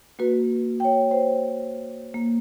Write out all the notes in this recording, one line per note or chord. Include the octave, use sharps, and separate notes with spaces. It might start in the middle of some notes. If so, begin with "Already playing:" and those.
A#3 F#4 B4
C#5 G5
C5
A#3